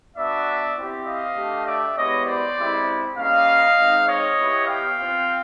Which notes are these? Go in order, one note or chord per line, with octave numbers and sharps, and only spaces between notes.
B3 D4 F#4 D5 E5
C4 E4 G4
D#5 F5
A3 D4 G4
D5 E5
G#3 B3 E4 G4 C#5 D#5
C5 D5
G#3 C4 E4 G4
G3 A#3 C#4 D#5 F5
G#3 C4 D#4
C#5 D#5
B3 E4 G4
F5 G5
C4 F4